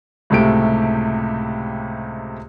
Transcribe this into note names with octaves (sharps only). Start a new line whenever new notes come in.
C#2 A2 C3 A3 G4 D7